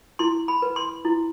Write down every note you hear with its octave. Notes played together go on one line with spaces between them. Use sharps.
E4 C6
B5
B4
C6
E4